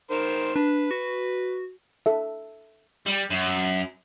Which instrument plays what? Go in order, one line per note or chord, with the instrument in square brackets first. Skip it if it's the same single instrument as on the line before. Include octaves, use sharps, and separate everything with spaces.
[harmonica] D#3 A#4 C5
[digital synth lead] D4 [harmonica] B4
[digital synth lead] F#4
[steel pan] A4 E5
[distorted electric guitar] G3
F#2